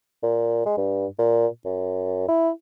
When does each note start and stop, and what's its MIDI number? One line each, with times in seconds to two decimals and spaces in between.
0.23 0.63 46
0.66 0.76 56
0.77 1.06 43
1.19 1.47 46
1.65 2.25 42
2.29 2.50 64